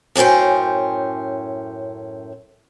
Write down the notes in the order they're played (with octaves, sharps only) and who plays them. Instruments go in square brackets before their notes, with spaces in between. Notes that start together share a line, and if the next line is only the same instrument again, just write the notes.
[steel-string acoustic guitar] F#2 A2 C#4 C5 G5